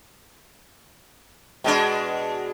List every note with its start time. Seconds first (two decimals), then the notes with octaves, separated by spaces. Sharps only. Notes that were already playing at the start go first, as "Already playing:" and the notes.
1.64 B2 G#3 D4